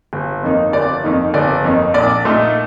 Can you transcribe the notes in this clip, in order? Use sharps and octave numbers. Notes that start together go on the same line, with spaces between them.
G1
F2 D#3 A#3 D#4
G1 D5
F2 D#3 A#3 D#4
G1 D5
F2 D#3 A#3 D#4
A#1 D5
A#2 A3 D#4